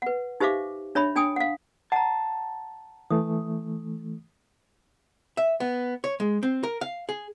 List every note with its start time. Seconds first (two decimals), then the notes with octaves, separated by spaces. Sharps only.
0.02 B4 F#5
0.40 D#4 G4 C5 E5 F5 D6
0.95 D4 C#5 E5 B5
1.16 D4 G5 G#5 D#6
1.36 F5 F#5
1.92 F#5 A5 A#5
3.10 E3 A3 D#6
5.37 E5
5.60 B3
6.04 C#5
6.20 G#3
6.43 C4
6.63 A#4
6.81 F5
7.09 G#4